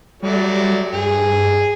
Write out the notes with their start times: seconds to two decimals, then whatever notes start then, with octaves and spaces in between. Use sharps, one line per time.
0.23 F#3 G3 A3 D5
0.93 G2 G#4